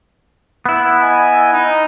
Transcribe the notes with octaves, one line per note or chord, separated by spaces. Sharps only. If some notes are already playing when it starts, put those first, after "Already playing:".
B3 E4
D#5 G#5
D#4